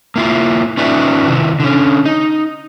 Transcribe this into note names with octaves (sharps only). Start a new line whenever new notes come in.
A#3 E4 F4
C#4 D#4 F4 B4 D5 E5
C3 D#3 E4
D3 C#4
D#4